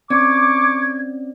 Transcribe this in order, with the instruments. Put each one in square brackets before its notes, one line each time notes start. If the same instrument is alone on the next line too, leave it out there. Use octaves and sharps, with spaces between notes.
[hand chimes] C4 C#4 D5 [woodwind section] C#6 D6 [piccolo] G#6